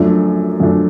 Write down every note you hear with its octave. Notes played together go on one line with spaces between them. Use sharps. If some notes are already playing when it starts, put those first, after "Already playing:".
Already playing: F#2 F3 A3 D4
F#2 F3 A3 D4